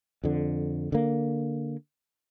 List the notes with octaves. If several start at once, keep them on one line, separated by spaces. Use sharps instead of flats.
F2 D3
D3 A#3